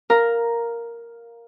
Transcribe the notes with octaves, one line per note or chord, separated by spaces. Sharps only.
A#4 F5 A#5